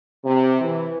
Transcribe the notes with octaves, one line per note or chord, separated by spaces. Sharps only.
C3
E3